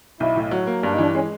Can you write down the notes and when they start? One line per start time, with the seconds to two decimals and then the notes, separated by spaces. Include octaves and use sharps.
0.20 B1 E4
0.36 A2
0.51 F#3
0.67 A#3
0.83 G2 D4
0.93 D#4
0.98 E3 D4
1.15 G#3 C#4